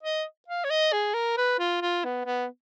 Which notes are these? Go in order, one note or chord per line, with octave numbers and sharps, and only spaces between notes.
D#5
F5
C#5
D#5
G#4
A#4
B4
F4
F4
B3
B3